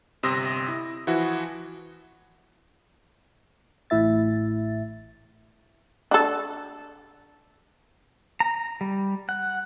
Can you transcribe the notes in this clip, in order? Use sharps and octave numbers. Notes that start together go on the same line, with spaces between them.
G1 C3 C6 D#6 E6 A#6
E4
E3 F3 E4 F#4
A1 A2 E4 E5 A6
D4 F#4 A4
A#5
G3
F#5